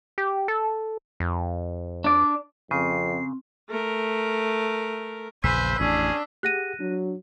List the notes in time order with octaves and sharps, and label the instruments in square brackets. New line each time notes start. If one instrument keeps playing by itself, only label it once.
[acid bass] G4
A4
F2
[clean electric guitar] D4 D5
[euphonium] F2 [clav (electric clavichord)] C#3 [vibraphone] C4 [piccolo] C7
[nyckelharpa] A3 A#4
[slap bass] A#1 E2 C#3 [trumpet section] B4 C5 [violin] G#5 [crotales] E6 B6
[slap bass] A1 F2 [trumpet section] C#4 G#4 [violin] D4
[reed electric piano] G4 G#4 F#5 [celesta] F#6 A#6 D#7
[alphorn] F#3 [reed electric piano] D4